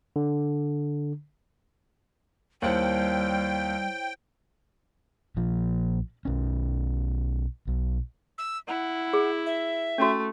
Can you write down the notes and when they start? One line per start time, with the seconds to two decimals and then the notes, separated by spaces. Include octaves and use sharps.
0.16 D3
2.62 D#2 G3 E4 C5 C#5 G5
5.37 A#1 A#2 F3
6.25 B1 C#4
7.67 B1
8.38 E6
8.68 E4 F#5
9.13 G#4
9.46 E5
9.98 A3 C#4 F#4